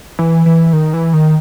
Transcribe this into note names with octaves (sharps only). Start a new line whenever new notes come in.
E3
E3
D#3
E3
D#3